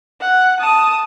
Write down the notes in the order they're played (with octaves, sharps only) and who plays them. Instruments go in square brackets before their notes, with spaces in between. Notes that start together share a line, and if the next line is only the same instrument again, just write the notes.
[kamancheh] F#5
A5 D#6